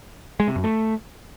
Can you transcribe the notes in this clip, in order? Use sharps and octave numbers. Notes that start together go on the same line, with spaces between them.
G#3
C3
F#2
A3